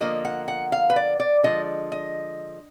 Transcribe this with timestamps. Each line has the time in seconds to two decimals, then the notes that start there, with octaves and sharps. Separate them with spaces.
0.01 D3 F3 A#3 D#5
0.25 F#5
0.48 F#5
0.72 F5
0.90 B4
0.96 D5
1.20 D5
1.43 D3 F3 G#3 D#5
1.92 D#5